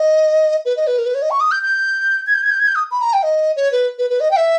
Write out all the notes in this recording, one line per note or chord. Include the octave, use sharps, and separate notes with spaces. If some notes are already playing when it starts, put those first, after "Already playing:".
Already playing: D#5
B4
D#5
B4
A#4
B4
C#5
D#5
C#6
D#6
G6
G6
G#6
G6
G#6
G6
G#6
G6
D#6
B5
A#5
G5
D#5
C#5
B4
B4
B4
D#5
G5
E5